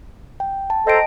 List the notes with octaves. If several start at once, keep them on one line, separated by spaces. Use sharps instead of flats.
G5
A5
A4 C5 D#5 G5 A#5 D7